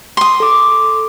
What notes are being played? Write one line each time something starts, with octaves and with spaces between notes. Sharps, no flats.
C6 D#6
A4 D6